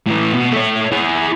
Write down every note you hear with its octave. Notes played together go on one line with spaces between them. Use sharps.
A2 E3
B2
A3 C#5
E4 G#4